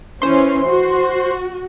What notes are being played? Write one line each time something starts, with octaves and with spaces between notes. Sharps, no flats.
E3 C#4 C5 C6
F#4